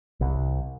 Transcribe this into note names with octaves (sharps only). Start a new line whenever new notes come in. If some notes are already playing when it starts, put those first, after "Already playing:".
C2